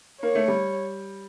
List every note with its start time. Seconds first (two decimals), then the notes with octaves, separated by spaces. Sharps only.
0.22 A#3 C#5
0.35 A3
0.48 G3